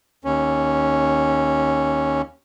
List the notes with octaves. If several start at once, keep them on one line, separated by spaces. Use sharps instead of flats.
D#2 C#4